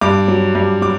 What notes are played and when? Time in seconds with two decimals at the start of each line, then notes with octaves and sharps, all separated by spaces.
0.01 G2 D6
0.28 F#3
0.55 G2
0.82 F#3 D6